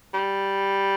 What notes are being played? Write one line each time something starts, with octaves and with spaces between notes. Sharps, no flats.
G3